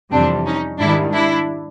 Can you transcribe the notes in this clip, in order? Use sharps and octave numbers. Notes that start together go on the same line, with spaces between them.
F2 C3 E3 G3 C4 D4
C#4 D#4
G#2 D#3 G3 D4 E4
D4 E4